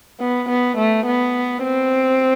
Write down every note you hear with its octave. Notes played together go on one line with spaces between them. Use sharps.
B3
B3
A3
B3
C4